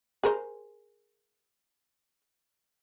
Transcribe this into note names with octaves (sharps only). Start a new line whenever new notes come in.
G#4 A#4 C5